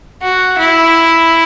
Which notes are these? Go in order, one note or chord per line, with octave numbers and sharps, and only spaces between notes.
F#4
E4